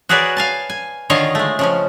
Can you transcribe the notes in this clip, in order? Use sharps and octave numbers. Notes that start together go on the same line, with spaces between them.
F#4 G#4 A#4 B4 C#5 D5
F5 G#5 A5
G#5
D3 D#3 F4 C#5 D#5 F5
G#3 A3
C#3 F3 C#4